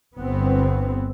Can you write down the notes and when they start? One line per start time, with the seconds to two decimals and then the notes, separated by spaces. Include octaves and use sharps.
0.20 G1 B3 C4